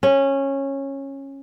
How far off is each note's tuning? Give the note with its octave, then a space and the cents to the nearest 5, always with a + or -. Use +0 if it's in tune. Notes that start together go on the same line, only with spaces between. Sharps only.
C#4 -15